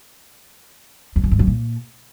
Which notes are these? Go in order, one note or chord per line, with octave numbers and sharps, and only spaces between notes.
F2
F#2
G2
F#2
A#2